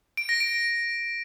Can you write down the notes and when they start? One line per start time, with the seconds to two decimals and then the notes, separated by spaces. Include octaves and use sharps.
0.17 D7
0.29 A#6
0.40 D7